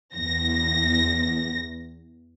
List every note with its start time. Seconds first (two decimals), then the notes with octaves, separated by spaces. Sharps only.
0.15 E2 A#6